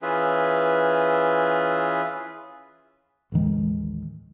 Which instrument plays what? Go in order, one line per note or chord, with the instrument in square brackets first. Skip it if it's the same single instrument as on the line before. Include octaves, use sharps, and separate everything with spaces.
[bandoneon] E3 C#4 F4 G#4 B4 E5
[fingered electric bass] A1 D#2 D#3 G#3